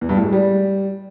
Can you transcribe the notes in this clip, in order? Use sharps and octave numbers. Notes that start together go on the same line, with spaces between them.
E2
G2
A2
G#3
G3